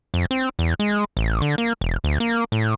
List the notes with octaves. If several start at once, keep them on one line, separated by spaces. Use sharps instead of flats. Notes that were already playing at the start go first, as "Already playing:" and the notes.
F2
C4
E2
G#3
A1
D3
A#3
E1
D2
A#3
A2